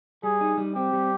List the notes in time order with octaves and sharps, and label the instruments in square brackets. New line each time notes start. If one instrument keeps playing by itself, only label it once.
[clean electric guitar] G3 [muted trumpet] G#4
[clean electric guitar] D#4
G3
[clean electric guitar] C4 [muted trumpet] G4
[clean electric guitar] G3